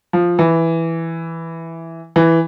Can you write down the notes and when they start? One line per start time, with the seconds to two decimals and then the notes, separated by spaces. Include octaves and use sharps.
0.13 F3
0.39 E3
2.16 E3